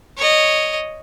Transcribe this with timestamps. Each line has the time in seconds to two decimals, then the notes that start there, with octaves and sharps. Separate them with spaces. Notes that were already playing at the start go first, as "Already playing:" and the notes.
0.17 C#5 D#5